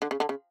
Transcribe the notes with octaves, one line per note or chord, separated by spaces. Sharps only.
D3
C#3
D3
C#3